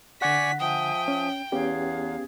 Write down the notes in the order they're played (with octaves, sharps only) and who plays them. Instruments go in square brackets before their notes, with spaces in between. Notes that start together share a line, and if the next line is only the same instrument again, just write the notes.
[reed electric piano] D3 F#5 [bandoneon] D5 G#5 C#6 [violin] B6
[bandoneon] F3 [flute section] E5 G#5 D#6 [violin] G5
[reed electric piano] C#4
[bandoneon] E2 [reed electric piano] B3 C#4 G4 [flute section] G#4 F5